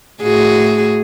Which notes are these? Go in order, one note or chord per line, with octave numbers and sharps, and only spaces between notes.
A2 F#4 G#4